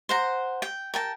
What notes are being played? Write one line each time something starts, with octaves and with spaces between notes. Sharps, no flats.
C5 F#5 A#5
G5
A#4 G5 A5